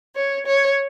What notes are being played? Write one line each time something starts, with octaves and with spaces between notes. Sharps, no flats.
C#5
C#5